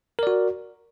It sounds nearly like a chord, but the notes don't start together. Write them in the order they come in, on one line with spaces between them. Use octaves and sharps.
A#4 D5 F#4